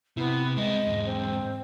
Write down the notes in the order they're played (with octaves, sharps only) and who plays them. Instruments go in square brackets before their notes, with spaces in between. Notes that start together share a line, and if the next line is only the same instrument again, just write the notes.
[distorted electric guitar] C3 [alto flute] B3 [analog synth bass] E4
[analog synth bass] G#3 [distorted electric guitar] C4 E4 [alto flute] D#5
[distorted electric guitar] E2 G#2
[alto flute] C4